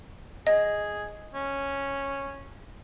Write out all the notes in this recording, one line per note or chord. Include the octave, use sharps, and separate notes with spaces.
G#4 D#5
C#4